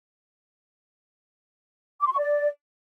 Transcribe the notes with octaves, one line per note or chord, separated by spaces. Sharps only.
D6
C6
C#6
D5